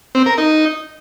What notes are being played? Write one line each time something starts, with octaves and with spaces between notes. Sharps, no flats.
C4
A#4
D#4